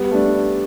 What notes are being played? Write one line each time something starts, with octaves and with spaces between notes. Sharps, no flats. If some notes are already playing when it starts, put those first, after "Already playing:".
Already playing: G3 B3
A3 D4